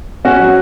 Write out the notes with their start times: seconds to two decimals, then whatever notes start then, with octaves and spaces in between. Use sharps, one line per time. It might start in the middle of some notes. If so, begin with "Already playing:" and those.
0.25 C#4 F#4
0.39 F#3